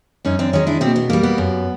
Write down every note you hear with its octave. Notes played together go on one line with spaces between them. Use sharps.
F#2 C#4 D#4
C4 D4
D#3 G#3 C#4 D#4
D4 E4
B2 A#3 C4
B3
G3 A#3 B3
B3
F#2